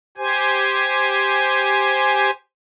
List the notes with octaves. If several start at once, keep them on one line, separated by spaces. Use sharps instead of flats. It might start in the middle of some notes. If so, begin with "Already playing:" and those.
G4 C5 G#5